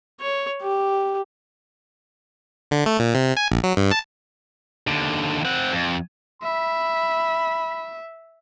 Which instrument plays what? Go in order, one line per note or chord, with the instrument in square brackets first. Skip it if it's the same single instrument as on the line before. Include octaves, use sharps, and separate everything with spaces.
[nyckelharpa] C#5
G4
[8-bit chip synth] D3
A3
A#2
C3
G#5
A#1
F#3
G2
A5
[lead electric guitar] D#2 D3
C4 F#5
F2
[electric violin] E5 [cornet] B5